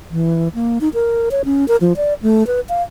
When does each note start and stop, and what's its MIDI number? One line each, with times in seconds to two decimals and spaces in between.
0.11 0.48 52
0.55 0.78 58
0.81 0.89 63
0.94 1.29 70
1.31 1.42 73
1.45 1.67 61
1.68 1.76 70
1.81 1.93 53
1.97 2.14 74
2.22 2.46 57
2.47 2.60 71
2.69 2.82 77